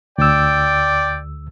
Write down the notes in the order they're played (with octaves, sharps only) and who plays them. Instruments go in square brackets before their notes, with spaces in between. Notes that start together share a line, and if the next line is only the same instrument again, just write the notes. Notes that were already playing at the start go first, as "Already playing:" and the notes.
[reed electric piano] D2 E6 [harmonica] D5 G5